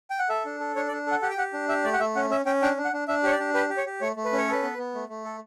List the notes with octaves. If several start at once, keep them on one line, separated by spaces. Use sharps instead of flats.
G5
F#5
A4 E5
D4
A4
D4 C#5
D5
D4
A4 F#5
G4 F#5
G5
G4 F#5
D4
G4 E5
A3 D5
F#5
A3 E5
C#4 F#5
C#4 E5
C#4 G5
D4 G5
D4
F#5
D4
D4 E5
G4 C#5
D5
D4
G4 B4
G4
C#5
G4
A3 C#5
A3
B4
C#4
C#5
A4 B4
B3
B3
A3
A3
A4